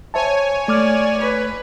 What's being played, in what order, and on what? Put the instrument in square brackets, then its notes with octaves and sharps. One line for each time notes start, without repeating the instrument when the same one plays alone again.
[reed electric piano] C5 E5 A5 [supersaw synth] C#5 G#5
[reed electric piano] A3 D6 F6 [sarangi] D5
[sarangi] B4